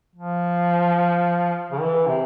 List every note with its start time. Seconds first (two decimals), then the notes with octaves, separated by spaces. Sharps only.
0.15 F3
1.72 C#3
1.81 E3
2.08 C3